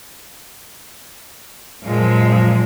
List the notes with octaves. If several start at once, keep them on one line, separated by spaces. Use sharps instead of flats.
F#2 A#2 F3 G#3